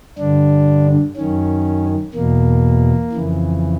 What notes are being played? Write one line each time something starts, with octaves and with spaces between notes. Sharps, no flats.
G2 D3 D4
F#2 D#3 C#4
E2 B2 A#3
F2 C#3 E3